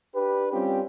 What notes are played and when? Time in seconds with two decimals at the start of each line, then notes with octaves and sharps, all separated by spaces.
0.15 D4 G4 B4
0.53 G3 C4 C#4 F4 G4